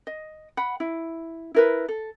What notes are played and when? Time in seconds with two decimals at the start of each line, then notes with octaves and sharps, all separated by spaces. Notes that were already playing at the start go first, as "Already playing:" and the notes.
0.07 D#5
0.57 F#5 B5
0.80 E4
1.54 E4 A#4 B4
1.88 A4